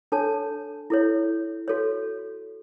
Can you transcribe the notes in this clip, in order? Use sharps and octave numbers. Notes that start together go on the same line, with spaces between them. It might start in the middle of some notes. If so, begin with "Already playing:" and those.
D4 A4 C#5 A5
E4 A4 C#5
F#4 A4 C#5